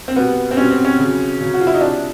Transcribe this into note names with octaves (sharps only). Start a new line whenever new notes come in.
C4
B2 G3 B3
C4
B2 G3 C#4
C4
C#4
C#3 F#3
C#3 F#3
F#4
F4
E4
D#4
C3 F3 D4